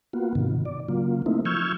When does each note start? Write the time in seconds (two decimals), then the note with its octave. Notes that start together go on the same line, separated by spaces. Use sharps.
0.13 A#3 B3 F4 F#4
0.35 G#2 C3 D#3
0.65 D5
0.89 C#3 F#3 A#3 F4
1.26 A3 A#3 C4 D#4 E4
1.45 F3 C#6 E6 F6 G6 G#6